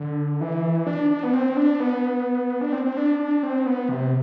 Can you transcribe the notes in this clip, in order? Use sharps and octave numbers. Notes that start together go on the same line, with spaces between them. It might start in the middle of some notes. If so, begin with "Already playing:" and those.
Already playing: D3
E3
D4
D4
B3
C4
D4
B3
D4
C4
C4
D4
D4
C4
B3
C3